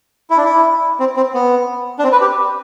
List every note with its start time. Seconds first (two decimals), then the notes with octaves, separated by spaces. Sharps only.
0.30 E4
0.37 D4
0.45 E4
1.00 C4
1.17 C4
1.34 B3
1.99 D4
2.04 C4
2.12 B4
2.21 G4